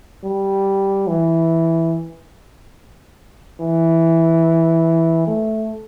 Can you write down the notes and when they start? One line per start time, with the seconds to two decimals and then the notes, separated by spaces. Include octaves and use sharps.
0.24 G3
1.08 E3
3.60 E3
5.28 A3